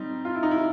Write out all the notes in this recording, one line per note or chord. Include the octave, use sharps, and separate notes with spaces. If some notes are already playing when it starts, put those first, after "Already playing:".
Already playing: G3 C4 D#4
F4
E4
D#4
E4